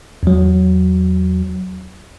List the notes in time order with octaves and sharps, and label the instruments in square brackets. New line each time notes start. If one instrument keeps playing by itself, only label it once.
[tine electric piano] E2 F#3